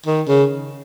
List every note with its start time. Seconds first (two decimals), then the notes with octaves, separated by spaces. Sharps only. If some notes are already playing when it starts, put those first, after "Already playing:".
0.06 D#3
0.28 C#3